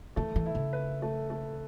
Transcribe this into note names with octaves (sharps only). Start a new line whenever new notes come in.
E3 A3
E3
E4
C#3
B4
A3
A3